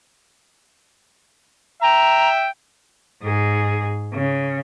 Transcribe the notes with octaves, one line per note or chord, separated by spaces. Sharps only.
E5 G5 A#5
G#2 G#4
C#3